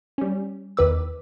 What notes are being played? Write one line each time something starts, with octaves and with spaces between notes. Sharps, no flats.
G3 C#4
E2 D#3 B4 D6 E6